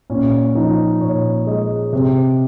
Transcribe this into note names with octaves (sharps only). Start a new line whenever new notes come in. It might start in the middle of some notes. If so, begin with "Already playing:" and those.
A#2 C#4
F3 D#4
A#2 C#5
G#3 D#5
C3